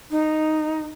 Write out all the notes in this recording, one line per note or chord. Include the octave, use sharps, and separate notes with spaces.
D#4